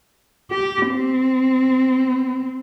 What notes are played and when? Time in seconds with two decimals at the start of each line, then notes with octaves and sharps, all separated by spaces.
0.51 G4
0.90 C4